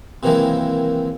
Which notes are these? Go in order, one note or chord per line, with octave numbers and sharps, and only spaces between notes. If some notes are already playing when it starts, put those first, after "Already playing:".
C3 D#3 E3 F#3 G#3 A#3